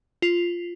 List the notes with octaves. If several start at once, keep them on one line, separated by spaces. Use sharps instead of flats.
F4